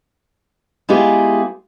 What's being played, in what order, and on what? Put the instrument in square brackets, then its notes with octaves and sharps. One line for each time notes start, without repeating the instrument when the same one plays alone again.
[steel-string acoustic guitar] G#3 B3 E4 F4 G4 G#4